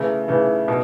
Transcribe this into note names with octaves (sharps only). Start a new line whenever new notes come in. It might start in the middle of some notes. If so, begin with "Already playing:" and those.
Already playing: C#3 E3 A3
C#3 E3 A3
B2